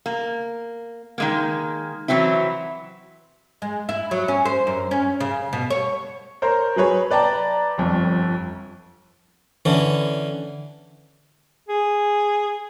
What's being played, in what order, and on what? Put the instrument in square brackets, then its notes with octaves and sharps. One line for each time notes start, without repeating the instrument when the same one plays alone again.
[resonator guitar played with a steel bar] A#3
D#3 G#3 A#3
E3 F#3 C4 E4
[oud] G#3
E4
F#3
C#4
C5
F#2
C#4
C#3
B2
C#5
[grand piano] A#4 C5 C#5 A#5
F#3 G#4 B4 C#5
B4 D5 G5 A5 A#5
G1 F2
[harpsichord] D3 E3 C#4
[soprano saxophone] G#4